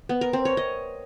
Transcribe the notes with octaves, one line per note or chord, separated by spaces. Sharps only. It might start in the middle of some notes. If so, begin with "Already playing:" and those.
B3
A#4
C4
C#5
D#5